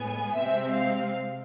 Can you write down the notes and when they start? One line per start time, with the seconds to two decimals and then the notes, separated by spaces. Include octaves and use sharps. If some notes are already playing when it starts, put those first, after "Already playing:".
Already playing: A2 G#3 B3 G#5
0.35 C3 G#3 C4 E5
0.73 F5